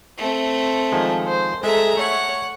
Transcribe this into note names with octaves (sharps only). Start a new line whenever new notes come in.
A3 C4
D#3 F3 G#3
C5
G#3 G#4 A4 E5 A#5
A3 C#5 F#5